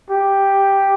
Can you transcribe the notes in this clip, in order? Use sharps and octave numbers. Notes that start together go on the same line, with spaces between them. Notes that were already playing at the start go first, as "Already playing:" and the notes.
G4